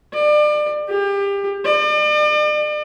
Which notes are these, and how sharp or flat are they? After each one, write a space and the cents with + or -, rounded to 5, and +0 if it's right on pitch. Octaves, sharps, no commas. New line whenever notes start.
D5 +30
G4 +30
D5 +40